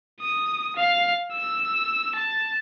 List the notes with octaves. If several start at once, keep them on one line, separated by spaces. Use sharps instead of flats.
D#6
F5
E6
A5